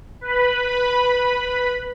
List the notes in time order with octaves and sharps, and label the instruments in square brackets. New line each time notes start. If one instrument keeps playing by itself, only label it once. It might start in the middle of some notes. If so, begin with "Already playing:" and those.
[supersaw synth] B4 B5